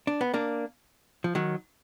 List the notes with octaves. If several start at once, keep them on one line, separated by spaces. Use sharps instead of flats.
D4
B3
A#3 D4
F3
D#3 F#3